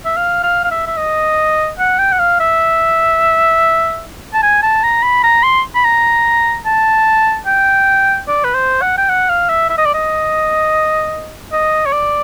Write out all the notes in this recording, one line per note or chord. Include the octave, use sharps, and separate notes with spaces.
E5
F5
F5
F5
E5
E5
D#5
F#5
G5
F#5
F5
E5
A5
G#5
A5
A#5
B5
A#5
C6
B5
A#5
A5
G5
D5
B4
C5
F#5
G5
F#5
F5
E5
E5
D#5
D5
D#5
D#5
C#5
D5